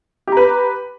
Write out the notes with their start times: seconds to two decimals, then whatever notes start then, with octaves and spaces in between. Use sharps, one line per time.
0.27 G4
0.32 A#5
0.37 B4